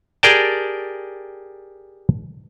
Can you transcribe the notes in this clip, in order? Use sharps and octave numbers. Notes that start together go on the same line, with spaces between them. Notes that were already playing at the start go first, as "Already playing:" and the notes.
G4 G#4 A#4 D5 G5 A5